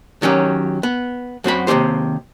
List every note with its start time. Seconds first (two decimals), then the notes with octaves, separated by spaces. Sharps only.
0.22 D#3 F#3 C#4 G4
0.83 B3
1.44 F#2 C4 F#4 B5
1.67 D#2 C3 F3 C#4 G4 C5